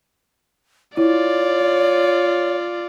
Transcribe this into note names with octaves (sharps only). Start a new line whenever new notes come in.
E4 F4 C#5 D5